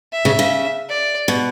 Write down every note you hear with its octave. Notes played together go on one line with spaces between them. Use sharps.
E5
C#3
C#3
D5
B2